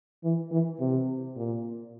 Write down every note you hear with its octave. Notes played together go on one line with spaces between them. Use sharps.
E3
E3
C3
A#2